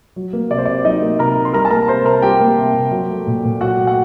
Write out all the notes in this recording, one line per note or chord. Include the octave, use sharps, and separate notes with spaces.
F#3
A#3
C3 D5
C5
C3 D5
F#3 D#4 D#5
A#3
C3 A#4 A#5
C3
C6
G3 A#4 A#5
A5
A#3 A#4 A#5
C3 C5 C6
C3 A#4 A#5
G3 G4 G5
A#3
C3
C3
F#3
A3
A#2
A#2
F#3 F#4 F#5
A3
F#5